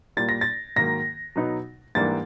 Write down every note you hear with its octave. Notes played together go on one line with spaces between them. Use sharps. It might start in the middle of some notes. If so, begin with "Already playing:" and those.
A#2 G3 A#3 A6
A#6
A6
G#2 D#3 F#3 A#3 A#6
B2 F#3 B3 D#4
G#2 E3 G3 A#3 D4 A6